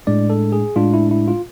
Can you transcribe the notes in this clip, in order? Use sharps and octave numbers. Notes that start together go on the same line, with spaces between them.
A2 G#3 D4 D5
A4
G#4
A2 G#3 D4 F4
E4
E4
F4